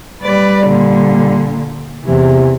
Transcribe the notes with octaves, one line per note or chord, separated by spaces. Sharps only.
G3 B4 D5
A#2 D3
E2 C3 E3